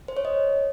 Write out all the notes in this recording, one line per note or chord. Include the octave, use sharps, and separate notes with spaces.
C5
C#5
D#5